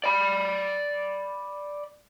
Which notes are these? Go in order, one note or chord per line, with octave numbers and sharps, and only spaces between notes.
D5 B5